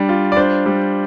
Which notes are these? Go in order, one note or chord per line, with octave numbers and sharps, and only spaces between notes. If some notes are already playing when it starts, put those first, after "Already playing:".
Already playing: G3 D4
F4
D5
D4 C5
G3